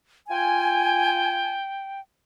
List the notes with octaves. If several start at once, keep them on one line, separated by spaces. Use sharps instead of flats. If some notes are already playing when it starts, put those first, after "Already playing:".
F4 G5 G#5